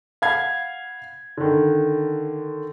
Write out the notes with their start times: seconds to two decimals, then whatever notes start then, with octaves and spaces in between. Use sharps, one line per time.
0.22 F5 F#5 B5 G#6 C7
1.37 D3 D#3